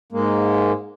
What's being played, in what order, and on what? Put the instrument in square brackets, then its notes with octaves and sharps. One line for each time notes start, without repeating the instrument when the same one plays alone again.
[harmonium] G#2 G#3 A#3